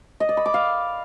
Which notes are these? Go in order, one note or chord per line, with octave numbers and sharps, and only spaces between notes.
D#5
D5
B5
D6
F5